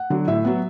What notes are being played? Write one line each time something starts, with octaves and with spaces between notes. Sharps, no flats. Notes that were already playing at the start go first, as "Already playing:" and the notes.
Already playing: F#5
D3 F#3
A2 E5
F#3 B3